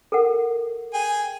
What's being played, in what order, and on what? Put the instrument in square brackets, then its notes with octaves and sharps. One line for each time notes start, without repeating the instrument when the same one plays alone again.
[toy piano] A4 A#4 F#5
[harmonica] G#4 G5 G#5